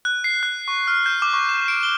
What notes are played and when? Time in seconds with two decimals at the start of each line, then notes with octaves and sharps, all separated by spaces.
0.05 F#6
0.24 C7
0.43 F#6
0.68 C#6
0.88 F6
1.06 G6
1.22 D6
1.33 C#6
1.49 E7
1.68 D7
1.83 G7